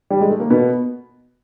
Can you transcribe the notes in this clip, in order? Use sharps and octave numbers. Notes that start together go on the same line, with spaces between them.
G3
G#3
A3
A#3
B2 B3